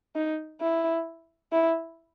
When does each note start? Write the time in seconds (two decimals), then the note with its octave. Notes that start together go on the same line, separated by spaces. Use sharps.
0.16 D#4
0.62 E4
1.52 E4